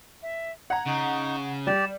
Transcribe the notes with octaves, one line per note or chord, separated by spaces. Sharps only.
E5
F#5 A#5 G#6
C#3 D#4 C#6
G3 G4 D5 E7